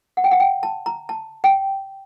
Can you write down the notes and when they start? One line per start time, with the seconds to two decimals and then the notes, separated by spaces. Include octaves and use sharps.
0.17 F#5
0.24 G5
0.31 F#5
0.40 G5
0.63 A5
0.86 A#5
1.09 A5
1.44 G5